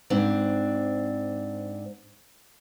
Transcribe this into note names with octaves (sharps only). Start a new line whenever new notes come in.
G#2 C4 D4